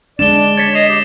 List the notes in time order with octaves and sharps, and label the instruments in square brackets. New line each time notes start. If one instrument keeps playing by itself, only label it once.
[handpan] G#3 D4 [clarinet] D5 [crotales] E7 G7
[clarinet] C#5 [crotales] A6 B6
[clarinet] D#5 [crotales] C7 F7
[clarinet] G4